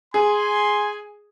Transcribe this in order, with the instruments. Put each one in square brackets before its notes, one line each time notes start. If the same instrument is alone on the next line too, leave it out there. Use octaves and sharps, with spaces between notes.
[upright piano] G#4 [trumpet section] G#5 [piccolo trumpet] C6